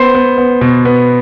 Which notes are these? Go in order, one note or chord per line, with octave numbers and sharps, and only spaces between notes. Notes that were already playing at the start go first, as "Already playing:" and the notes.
Already playing: B3 C5 C6
B3
B3
B2
B3